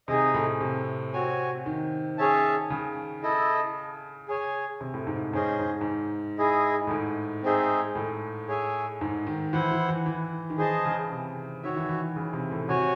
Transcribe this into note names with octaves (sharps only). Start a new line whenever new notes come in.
C3 D#4 G#4 D#5
A2
C3
C4 F#4 C#5 G#5
D#3
C#4 G#4 C#5 E5 A5
C#3
E4 A4 D#5
G#4 C#5 G#5
C3
A2
G#2
G#2 C#4 G#4 C5 D#5
G#2
G#2
E4 G#4 D#5
A2
G#2
C4 D#4 G#4 C5 E5
A2
G#4 C#5 E5 G#5
G#2
D#3
E3 E4 C5 F#5
E3
E3
E3
D#3
E3 G#4 C5 D#5 A5
C#3
C3
D#3 F#4 C#5 E5
E3
E3
C#3
C3
A2
C3 F#4 C#5 G#5